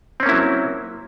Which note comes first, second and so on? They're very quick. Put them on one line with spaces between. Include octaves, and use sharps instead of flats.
C4 C#4 A#3 E4 F#3